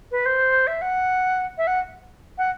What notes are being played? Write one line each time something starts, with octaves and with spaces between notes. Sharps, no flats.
B4
C5
E5
F#5
E5
F#5
F#5